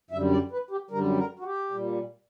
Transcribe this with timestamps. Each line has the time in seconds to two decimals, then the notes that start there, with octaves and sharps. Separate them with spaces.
0.11 F#2 D3 G3 E5
0.31 D5
0.51 B4
0.71 G4
0.91 F#2 D3 G3 A#4
1.17 A#4
1.39 F#4
1.44 G4
1.71 A#2 G3